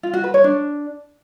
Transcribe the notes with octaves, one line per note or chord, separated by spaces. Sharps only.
F4
F#4
B4
C#5
D4